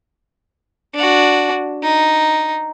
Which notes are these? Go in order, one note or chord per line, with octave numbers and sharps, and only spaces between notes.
D4 F#4
D#4